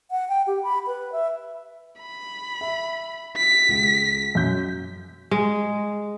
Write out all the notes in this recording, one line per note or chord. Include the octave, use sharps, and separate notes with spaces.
F#5
G5
G4
B5
B4
E5
B5
E5
B6
C#2
F#2 G6 B6
G#3